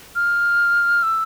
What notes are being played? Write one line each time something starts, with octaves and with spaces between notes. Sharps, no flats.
F6
E6